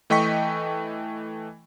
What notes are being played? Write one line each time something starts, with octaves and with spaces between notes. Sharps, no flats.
E3 A3 D#5 G5 C#6 B6